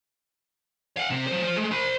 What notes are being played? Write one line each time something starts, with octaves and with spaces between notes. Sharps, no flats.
F5 F#5
C3 C4
F#3 C5
F4 C5
G#3 A3
C5 B5